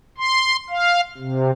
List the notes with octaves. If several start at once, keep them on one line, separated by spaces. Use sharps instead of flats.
C6
F5
C3